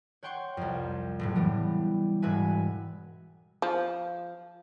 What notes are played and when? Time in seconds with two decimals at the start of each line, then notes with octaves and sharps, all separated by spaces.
0.23 C#5 F#5 G5 C6 C#6
0.57 C2 F2
1.19 F#1 A2 F#3
1.36 E3 G3 B3
2.22 E1 G#2 F#4 B4 E5 G#5
3.62 F3